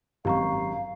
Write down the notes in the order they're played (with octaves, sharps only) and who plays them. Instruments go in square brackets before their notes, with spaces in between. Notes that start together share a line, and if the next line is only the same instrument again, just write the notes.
[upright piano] G#1 F#2 [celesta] G4 A#5 C#6 [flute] F5